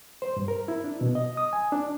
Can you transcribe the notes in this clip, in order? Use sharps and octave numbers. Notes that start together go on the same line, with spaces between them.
C5
G2
A#4
E4
D4
B2
D#5
D#6
G#5
D4